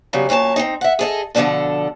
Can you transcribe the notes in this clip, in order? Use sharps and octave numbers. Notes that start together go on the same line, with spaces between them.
C#3 F#3 G3 B3
F#2 A#2 C#5 G#5 A5
C4 C#4 D#4
E5 F#5
G#4 A4 D#5
B2 D3 F3 A#3 D4 A4